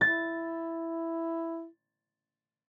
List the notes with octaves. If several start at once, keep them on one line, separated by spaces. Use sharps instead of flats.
E4 A6